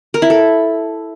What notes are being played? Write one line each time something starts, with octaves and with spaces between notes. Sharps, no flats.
A#4
E4
A4